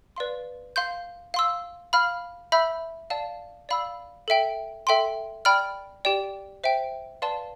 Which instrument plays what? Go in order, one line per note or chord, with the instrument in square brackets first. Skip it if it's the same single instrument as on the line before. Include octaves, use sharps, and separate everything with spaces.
[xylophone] B4 D5 F5 C6
F5 C6 G6
F5 C6 E6
F5 B5 F6
E5 B5 E6 G6
D5 F5 A5
D5 F5 B5 E6
A4 E5 G5
A4 E5 G5 C6
D5 G5 B5 F6
G4 D5 G5
C5 E5 G5
B4 D5 F5 A5 C6